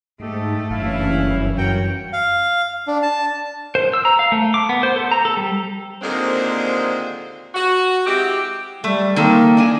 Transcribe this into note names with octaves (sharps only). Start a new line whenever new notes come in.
G#2 A3 G4 A4 D#5
F#1 G2 E3 C#4 E4 F5
F#2 F#4 A#4 C#5 G5
F5
D4
A5
C5
E6
A#5
F5
A3
D6
B3
C5
A4
A#5
A4
G3
D#2 A#2 D3 G#3 C4 C5
F#4
G#3 C4 E4 G4
G3 A3
D#3 A#3 C4 A4
D4 D#5 G#5